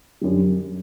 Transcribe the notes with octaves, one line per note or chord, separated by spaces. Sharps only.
F#2 D3 G3